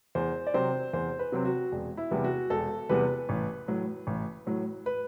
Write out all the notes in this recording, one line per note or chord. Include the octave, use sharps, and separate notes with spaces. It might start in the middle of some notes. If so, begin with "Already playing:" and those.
E2 C5
D5
C3 F#3 C4 C5
E2 C5
B4
C3 F#3 C4
F#4
E1
E4
E2 C3 G3 B3
F#4
E1 A4
E2 C3 G3 B3 B4
A1
A2 F#3
A1
A2 F#3
B4